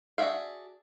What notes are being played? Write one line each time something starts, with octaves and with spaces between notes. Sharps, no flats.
D4 F#4 G#4 E5 F5